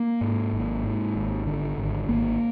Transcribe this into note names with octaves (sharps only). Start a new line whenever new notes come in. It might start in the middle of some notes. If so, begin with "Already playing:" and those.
Already playing: A#3
G#2
G#1
G#2
G#1
D3
G#1
G#1 A#3